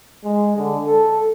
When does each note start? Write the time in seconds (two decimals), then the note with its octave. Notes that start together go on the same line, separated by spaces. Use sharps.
0.24 G#3
0.57 D3
0.85 A4